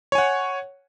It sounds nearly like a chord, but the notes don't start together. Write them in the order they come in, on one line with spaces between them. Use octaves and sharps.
C#5 G#5 F#5